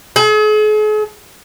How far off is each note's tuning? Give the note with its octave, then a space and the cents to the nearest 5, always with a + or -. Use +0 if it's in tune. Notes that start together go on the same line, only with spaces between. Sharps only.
G#4 +45